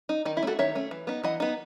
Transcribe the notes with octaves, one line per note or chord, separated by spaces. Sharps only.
D#4
D#3 D#4
E4
A3 C#4 F#4 A4
D#3 C#5 E5
A3 C#4
E3
B3 D#4
E3 D#5 F#5
B3 D#4